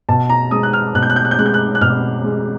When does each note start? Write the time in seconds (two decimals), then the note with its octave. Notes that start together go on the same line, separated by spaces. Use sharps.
0.09 B2 A5
0.29 A#5
0.51 G#3 D#6
0.63 F#6
0.73 F6
0.95 B2 F#6
1.03 G6
1.10 F#6
1.16 G6
1.25 F#6
1.31 G6
1.39 G#3 F#6
1.46 G6
1.54 F#6
1.75 F#6
1.81 B2 F6
2.24 G#3